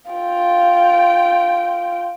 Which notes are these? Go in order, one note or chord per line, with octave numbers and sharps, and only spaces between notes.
F4 G5